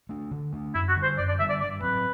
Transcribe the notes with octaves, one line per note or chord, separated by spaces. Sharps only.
A3 D4
D3
A3 D4
F#2 E4
F#4
D3 G3
C5
F#2 D5
D5
D3 G3 E5
D5
G2 D5
F#3 C4 B4